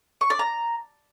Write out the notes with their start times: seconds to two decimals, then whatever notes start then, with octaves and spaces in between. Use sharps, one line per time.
0.21 C#6
0.30 D5
0.39 A#5